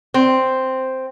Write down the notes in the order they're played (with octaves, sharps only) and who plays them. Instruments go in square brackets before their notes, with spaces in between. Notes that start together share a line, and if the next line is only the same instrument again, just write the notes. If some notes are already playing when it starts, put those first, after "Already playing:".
[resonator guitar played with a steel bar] C4